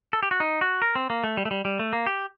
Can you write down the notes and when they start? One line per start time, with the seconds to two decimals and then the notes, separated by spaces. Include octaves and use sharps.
0.13 A4
0.23 G4
0.31 F#4
0.40 D#4
0.61 F#4
0.82 A#4
0.95 C4
1.10 A#3
1.24 A3
1.37 G3
1.45 A3
1.51 G3
1.65 G3
1.79 A3
1.93 A#3
2.06 G4